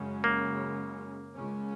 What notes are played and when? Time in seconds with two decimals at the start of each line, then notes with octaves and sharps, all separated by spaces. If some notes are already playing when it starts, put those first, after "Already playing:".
Already playing: F#2 C#3 G#3 C#4
0.24 A#3
1.36 C#2 C#3 G#3 C#4